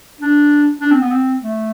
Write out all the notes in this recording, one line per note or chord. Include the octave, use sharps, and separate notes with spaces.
D4
D4
C4
B3
C4
A3